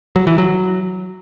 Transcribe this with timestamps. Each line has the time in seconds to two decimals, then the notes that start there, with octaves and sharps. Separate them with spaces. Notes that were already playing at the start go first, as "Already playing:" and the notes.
0.16 F#3
0.27 E3
0.38 F#3